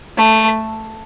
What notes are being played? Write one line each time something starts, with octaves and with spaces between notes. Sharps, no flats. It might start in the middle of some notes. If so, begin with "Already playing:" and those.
A3